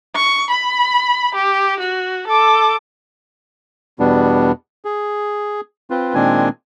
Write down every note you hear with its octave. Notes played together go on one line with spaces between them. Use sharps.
C#6
B5
G4
F#4
A4 D6
E2 B2 G3 B3 D4
G#4
C4 F4 B4
A#2 D#3 G#3 C4 D4 G#5